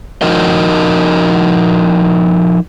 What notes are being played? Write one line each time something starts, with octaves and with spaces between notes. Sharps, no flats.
F3 D#4 F#4 A#4 D#5